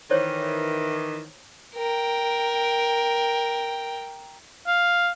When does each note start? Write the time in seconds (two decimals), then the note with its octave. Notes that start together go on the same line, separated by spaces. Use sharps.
0.11 D#3 E3 C5 C#5
1.75 A#4 G5
4.67 F5